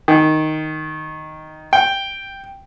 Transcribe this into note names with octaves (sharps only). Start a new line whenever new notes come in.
D#3
G5